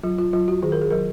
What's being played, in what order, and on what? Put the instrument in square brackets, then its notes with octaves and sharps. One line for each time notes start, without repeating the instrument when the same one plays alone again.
[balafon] F#3 F4
F4
F#3 F4
F#4
D#3 G#4
A#4
G#4
F#3 A#4